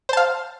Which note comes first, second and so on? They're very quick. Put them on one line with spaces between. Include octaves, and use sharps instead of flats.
C5 A5 F5